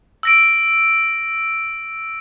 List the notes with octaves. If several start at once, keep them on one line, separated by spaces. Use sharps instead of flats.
E6 A#6 D7